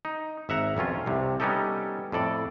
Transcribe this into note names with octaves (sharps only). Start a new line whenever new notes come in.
D#4
G#1 E5 F#5 A#5
B1 F2 C#4 F4
C2 C3
G3 B3 C#4 D#4 G4 A4
F2 A2 A4 D5